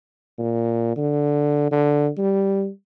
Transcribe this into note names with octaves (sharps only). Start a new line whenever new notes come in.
A#2
D3
D3
G3